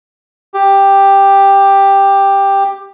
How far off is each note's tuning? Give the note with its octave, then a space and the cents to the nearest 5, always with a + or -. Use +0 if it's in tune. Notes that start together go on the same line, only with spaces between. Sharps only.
G4 +10